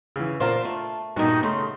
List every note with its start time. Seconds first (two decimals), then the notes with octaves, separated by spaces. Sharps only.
0.16 C#3 E3
0.40 A#2 D4 F4 A#4 C5 F5
0.65 A3
1.16 G2 A#2 D#3 D#4 F#4
1.43 C#3 A3 C6